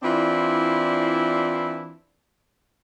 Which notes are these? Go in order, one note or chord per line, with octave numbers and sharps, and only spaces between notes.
E3 C4 D4 E4 F4 D5